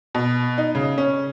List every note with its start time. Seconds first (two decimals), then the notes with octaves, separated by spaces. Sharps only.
0.15 B2
0.58 D#4
0.75 C#3
0.98 C#4